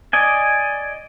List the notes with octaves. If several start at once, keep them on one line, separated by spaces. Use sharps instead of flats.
D5 D#5 G#5